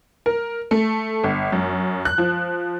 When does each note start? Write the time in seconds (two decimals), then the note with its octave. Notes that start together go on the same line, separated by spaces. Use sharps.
0.26 A#4
0.71 A3
1.24 G1
1.52 F#2
2.05 F#6
2.18 F3